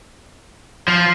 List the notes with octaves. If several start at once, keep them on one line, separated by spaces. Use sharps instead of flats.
F3